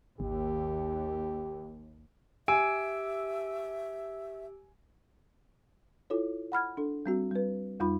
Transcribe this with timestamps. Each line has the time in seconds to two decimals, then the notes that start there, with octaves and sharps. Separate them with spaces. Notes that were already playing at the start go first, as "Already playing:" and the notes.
0.20 G#1 D#2 G4
2.48 G4 E5 G#5 E6 D7
6.10 E4 F4 A4 C#5
6.52 F#5 B5 F6 G#6
6.77 D4 A4
7.06 G3 C4 F#4
7.31 G3 B4
7.80 F2 G3 D#4 F4 B5